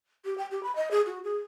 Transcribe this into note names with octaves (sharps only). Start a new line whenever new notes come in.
G4
G5
G4
B5
D#5
G#4
F#4
G#4